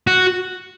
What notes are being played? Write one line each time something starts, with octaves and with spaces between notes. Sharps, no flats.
F#4